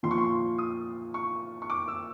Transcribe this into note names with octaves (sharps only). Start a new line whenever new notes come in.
A#2 F3 C6
C#6
C6
D#6
C#6
C#6
D6
E6